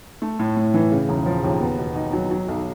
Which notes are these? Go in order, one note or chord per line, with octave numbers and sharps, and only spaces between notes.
A3
A2
A2
E3
C#3
E1
F3
D#2
B3
B2
D#4
F#3
F#3
B1